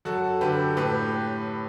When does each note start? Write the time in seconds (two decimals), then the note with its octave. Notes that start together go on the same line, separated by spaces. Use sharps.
0.05 F#2 F#4 A4
0.41 D3 G4 B4
0.77 A2 G4 B4